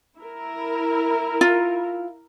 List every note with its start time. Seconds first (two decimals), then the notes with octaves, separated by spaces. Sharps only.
0.18 E4 A#4
1.41 F4